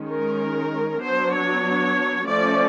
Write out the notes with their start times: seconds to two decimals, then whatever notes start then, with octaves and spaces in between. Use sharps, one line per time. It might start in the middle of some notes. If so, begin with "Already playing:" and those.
Already playing: D#3 G#3 C#4
0.11 A#4
1.04 F#3 B3 D4 C5
1.35 C#5
2.28 F3 A3 C#4 D5